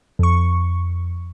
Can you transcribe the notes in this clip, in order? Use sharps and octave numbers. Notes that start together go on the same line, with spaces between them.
F2 C#6